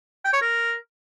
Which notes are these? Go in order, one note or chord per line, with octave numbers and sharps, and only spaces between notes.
G5
C#5
A#4